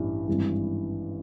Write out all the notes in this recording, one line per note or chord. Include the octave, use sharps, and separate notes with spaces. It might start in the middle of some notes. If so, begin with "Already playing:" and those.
Already playing: A1 G2 E3 G3
G#1 G2 E3